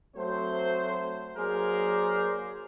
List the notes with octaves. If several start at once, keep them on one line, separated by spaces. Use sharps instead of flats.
F#3 A3 C4 C5
F#3 A#3 G#4 A#4 C5 D5